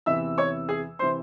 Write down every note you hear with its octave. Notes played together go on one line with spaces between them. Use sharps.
E2 C3 E3 E5 E6
C#5 C#6
G#4 G#5
C3 E3 C5 C6